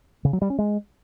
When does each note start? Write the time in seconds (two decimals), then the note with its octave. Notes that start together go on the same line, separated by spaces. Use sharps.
0.25 C#3
0.33 F#3
0.42 G3
0.50 C#4
0.58 G#3